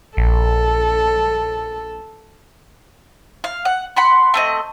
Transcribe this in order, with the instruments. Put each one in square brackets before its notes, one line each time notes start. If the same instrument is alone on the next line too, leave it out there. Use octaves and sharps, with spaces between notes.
[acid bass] A#1 [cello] A4
[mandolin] F5
F#5
F#5 B5 C6
A3 C4 D#5